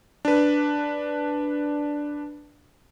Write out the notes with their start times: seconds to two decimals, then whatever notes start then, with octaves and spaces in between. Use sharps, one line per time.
0.25 D4 B4